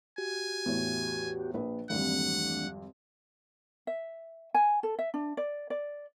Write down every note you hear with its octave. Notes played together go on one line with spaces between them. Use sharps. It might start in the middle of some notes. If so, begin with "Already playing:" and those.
F#4 G4 G#5
E2 A2
A#1 B4
G#1 F2 E3 G3 A3 D4 F#5
E5
G#5
A4
E5
D4
D5
D5